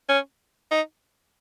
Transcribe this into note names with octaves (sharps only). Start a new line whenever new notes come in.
C#4
D#4